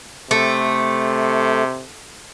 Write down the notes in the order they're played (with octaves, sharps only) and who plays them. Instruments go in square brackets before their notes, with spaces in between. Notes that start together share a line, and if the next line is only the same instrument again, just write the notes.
[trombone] C3 [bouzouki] A3